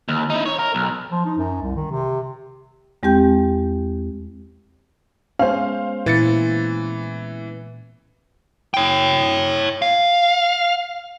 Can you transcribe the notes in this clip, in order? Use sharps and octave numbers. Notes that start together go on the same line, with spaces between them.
D#2
D#4 E4
C#5
A#4
B1
F3
D#4
F#2
C2
D#3
C3
E2 G#3 C4 G4 G5 G6
G#3 B3 C#4 C5 F5
A#2 E3 A6 C#7
C#5 G5
F5